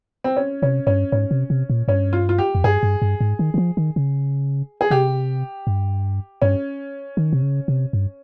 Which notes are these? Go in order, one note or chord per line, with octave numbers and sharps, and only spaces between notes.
C4
C#4
C3 C#4
G2 C#4
G#2 C#4
C3
C3
A#2
G2 C#4
F4
F4
G4
F2
G2 G#4
G2
G2
G#2
D#3
D#3
F3
D#3
C#3
G#4
C3 G4
G2
G2 C#4
D#3
C3
C#3
C3
G2